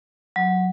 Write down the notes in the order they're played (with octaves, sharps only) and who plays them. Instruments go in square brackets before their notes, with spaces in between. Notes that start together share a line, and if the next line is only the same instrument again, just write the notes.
[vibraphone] F#3